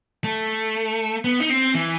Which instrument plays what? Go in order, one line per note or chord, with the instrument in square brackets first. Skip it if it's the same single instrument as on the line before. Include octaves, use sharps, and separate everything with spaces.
[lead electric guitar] A3
B3
D#4
C4
E3